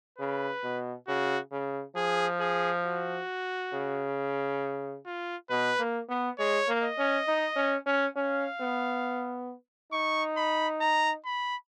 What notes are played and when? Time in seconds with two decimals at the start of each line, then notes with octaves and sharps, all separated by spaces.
0.18 C#3 B4
0.63 B2
1.08 C#3 F#4
1.52 C#3
1.96 F3 G#4
2.40 G#4
2.85 F#4
3.73 C#3
5.06 F4
5.50 B2 B4
5.79 A#3
6.09 B3
6.39 G#3 C#5
6.68 A#3
6.83 D#5
6.98 C#4
7.28 D#4
7.56 C#4
7.86 C#4
8.16 C#4 F5
8.60 B3
9.92 D#4 C#6
10.37 B5
10.81 A#5
11.25 B5